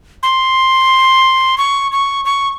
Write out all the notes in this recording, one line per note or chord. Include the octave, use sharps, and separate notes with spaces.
C6
C#6
C#6
C#6